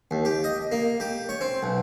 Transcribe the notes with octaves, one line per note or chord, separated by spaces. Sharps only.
D#2
G4
D#5
A#3
G4
C#5
C4
B1